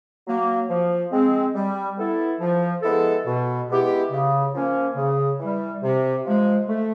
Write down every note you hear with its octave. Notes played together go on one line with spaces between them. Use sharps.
F#3 A#3
F3
G#3 C4
G3
B3 E4 A4
F3
G#3 B3 E4 A4
B2
G#3 B3 E4 G4
C#3
F3 A#3 C#4
C#3
E3 G3
C3
F3 G#3
A3